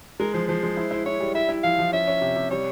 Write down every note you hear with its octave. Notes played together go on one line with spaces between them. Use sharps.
G#3 A#4
F3 C5
F3 C5
G#3
E4
E4
E4 C#5
G3
E4 E5
E4
F3 F5
F3
C#4 E5
C#4
C3
C3
G3 C#5